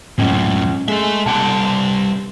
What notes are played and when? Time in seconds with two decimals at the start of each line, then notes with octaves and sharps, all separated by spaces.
0.19 F#2 A2 G#3 C#4
0.88 G#3 G#4 A4 E5
1.26 G2 C3 D5 F#5 A5